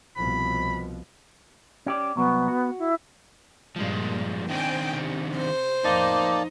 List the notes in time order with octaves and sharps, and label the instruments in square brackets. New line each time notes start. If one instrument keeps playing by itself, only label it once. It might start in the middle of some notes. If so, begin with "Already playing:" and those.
[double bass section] C2 B2 F3 [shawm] B5
[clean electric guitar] C#4 G4 D5
[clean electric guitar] C2 F#3 [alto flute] B3
[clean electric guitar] F#4
[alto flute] E4
[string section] G2 A#2 [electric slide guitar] F3 G#3
[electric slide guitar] D#3 C4 D4 [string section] C5 G5 G#5
[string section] C3
[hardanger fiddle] C5
[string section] A1 F2 [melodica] A#3 D5 A5 [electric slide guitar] D#4